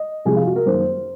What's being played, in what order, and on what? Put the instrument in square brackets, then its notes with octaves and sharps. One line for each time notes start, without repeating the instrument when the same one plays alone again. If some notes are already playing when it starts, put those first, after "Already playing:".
Already playing: [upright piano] D#5
C3 F3 G#3 G#4
F4
F#4
A#4
F#2 D#3 A#3 C5